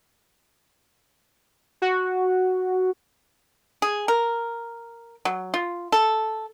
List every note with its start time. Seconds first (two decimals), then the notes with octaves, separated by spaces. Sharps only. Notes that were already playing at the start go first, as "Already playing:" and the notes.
1.82 F#4
3.82 G#4
4.08 A#4
5.25 F#3
5.54 F4
5.92 A4